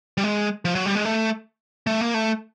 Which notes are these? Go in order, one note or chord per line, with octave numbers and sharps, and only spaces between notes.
G3
G#3
F3
F#3
G3
G#3
A3
A3
A#3
A3